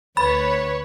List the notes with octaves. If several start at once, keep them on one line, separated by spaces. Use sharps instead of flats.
D2 B4 C#5 B5